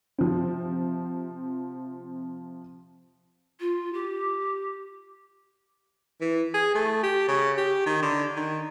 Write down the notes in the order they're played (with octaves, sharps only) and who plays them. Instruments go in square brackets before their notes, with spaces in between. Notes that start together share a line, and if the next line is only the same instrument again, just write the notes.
[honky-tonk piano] C3 F3 C4
[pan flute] F4
G4
[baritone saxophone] E3
G#4
A3
G4
C#3
G4
D#3
D3
D#3